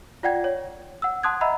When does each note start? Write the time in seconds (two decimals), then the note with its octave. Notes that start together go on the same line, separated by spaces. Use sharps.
0.23 F4 D5 F#5 G5 G#6
0.44 C#5
1.02 F#5 E6
1.23 F#5 A5 C6 D#6 F#6 G#6
1.41 D#5 E5 F#5 A#5 B5 E6